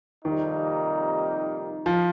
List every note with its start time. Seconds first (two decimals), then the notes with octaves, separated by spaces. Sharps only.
0.25 F2 C3 D#3 G3 A#3 D#4
1.86 F3